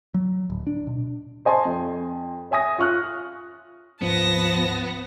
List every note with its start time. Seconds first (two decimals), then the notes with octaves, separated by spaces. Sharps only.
0.14 F#3
0.50 D1
0.67 D4
0.87 B2
1.45 C5 D#5 G#5 A5 C6
1.65 F2
2.51 C#5 E5 G#5 D#6 A#6
2.78 F4 C#6 F6 F#6
4.02 D1 G#2 F3 B3 C4 A5 A#6